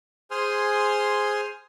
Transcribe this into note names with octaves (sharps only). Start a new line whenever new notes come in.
G#4 C5 G#5 C6 D#6 F6